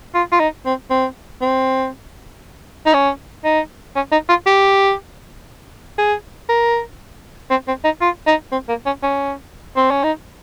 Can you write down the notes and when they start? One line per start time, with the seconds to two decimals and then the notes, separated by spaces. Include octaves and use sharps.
0.15 F4
0.32 F4
0.40 D#4
0.66 C4
0.90 C4
1.42 C4
2.86 D#4
2.94 C#4
3.44 D#4
3.96 C#4
4.12 D#4
4.29 F4
4.46 G4
5.98 G#4
6.49 A#4
7.50 C4
7.68 C4
7.84 D#4
8.01 F4
8.27 D#4
8.52 C4
8.69 A#3
8.86 C#4
9.03 C#4
9.76 C4
9.91 C#4
10.04 D#4